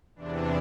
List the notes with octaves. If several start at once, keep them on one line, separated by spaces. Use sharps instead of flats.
E2 C3 E3 D4